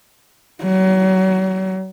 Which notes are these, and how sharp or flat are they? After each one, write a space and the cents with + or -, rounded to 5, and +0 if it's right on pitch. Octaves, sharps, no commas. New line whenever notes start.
F#3 +30